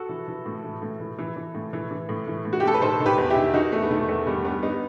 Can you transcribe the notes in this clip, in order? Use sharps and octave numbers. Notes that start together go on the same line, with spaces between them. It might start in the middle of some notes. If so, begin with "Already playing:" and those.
Already playing: F#4 A4
E3
E3
A2
E3
A2
E3
E3
E3
A2
E3
E3
A2
E3
A2
F#4
G4
A2 A4
B4
D#3 A4 C5
D#3
G4 B4
E2
E4 G4
D#3
D#3 D#4 F#4
E2 A3
B3
D#3 A3
E2 A3
D#3 G3 B3
G2 G3 B3
G2 B3 D#4